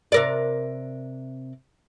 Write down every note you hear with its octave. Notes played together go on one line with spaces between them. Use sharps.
C3 A#4 D5